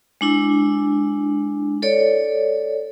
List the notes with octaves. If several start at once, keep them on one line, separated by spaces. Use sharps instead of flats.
G#3 D4 E4
A4 C#5 D5